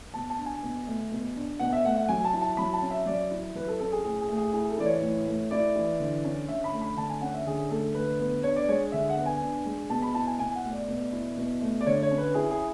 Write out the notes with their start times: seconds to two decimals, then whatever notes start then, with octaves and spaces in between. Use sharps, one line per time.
0.14 B2 A5
0.30 A5
0.38 D4
0.45 G#5
0.63 B2
0.87 A3
1.12 B2
1.36 D4
1.60 B2 F#5
1.73 E5
1.85 A3 F#5
1.96 F#5
2.08 F#3 G#5
2.25 A5
2.33 E4
2.41 A5
2.57 F#3 B5
2.73 A5
2.82 C#4
2.91 E5
3.06 F#3 D5
3.31 E4
3.55 F#3 B4
3.68 A4
3.80 C#4 A4
3.92 G#4
4.04 A2 G#4
4.21 G#4
4.29 A3
4.37 G#4
4.53 E4 G#4
4.69 A4
4.78 E3 D5
4.86 C#5
5.02 A2
5.27 A3
5.51 E4 D5
5.76 E3
6.00 D3
6.24 C#4
6.49 D3 E5
6.64 B5
6.73 A3
6.82 B5
6.97 D3 A5
7.09 G#5
7.22 C#4 F#5
7.34 E5
7.47 D3 G#4
7.70 A3 A4
7.94 D3 B4
8.19 B3
8.43 D4 C#5
8.56 D5
8.68 G#3 C#5
8.92 D3 E5
9.10 F#5
9.17 B3
9.26 G#5
9.42 D4
9.65 G#3
9.90 B2 A5
10.02 B5
10.15 E4 A5
10.27 G#5
10.39 B2 G#5
10.56 F#5
10.64 A3
10.72 D5
10.88 B2
11.12 E4
11.37 B2
11.62 A3
11.81 D5
11.86 D3 C#5
12.02 C#5
12.11 C#4
12.18 B4
12.34 E4 G#4
12.50 G#4